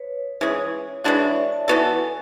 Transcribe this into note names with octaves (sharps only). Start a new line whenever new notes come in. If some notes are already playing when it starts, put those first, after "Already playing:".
Already playing: B4 C#5
E3 G#3 C#4 G#4
E3 G#3 D4 F#4 C#5
E5
D5
E5
A5
E3 B3 F#4 A4 G#5
G#5